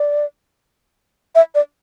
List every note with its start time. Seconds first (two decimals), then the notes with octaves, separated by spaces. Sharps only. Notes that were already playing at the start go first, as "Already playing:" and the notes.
Already playing: D5
1.35 E5
1.55 D5